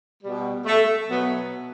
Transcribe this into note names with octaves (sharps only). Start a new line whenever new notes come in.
B2 G3
A3
B2 F#3 B3